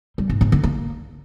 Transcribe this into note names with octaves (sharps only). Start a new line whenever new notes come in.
G3
G#2
G#2
D3
A#3